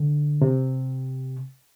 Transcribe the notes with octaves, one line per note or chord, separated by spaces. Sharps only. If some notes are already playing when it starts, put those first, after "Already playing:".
Already playing: D3
C3